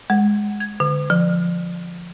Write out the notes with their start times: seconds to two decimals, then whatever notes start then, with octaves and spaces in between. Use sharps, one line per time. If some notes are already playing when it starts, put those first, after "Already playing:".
0.10 G#3
0.60 G#6
0.80 D3
1.10 F3